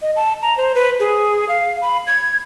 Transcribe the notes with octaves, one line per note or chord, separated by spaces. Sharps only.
D#5
A5
A#5
C5
B4
G#4
F5
B5
G#6